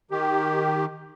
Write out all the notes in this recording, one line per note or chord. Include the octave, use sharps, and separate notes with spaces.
D#3 G4